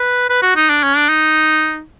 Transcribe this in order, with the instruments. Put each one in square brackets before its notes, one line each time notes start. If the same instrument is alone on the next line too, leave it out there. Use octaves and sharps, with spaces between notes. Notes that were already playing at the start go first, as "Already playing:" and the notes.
Already playing: [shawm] B4
B4
F#4
D#4
D4
C#4
D4
D#4